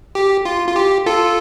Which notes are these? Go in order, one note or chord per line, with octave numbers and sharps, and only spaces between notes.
G4
F4
F4
G4
F4 A4